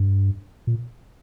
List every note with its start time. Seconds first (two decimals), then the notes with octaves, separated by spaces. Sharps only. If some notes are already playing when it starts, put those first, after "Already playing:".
Already playing: G2
0.67 A#2